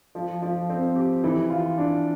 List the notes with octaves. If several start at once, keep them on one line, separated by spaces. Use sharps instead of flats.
F3
F3
C4
G4
E3
F4
D4